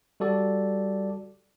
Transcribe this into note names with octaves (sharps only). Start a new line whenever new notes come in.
G3 F#4 A4 D5